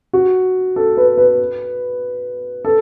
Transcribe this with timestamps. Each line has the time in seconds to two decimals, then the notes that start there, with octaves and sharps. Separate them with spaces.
0.13 F#4
0.76 A4
0.97 B4
1.18 B4
2.65 A4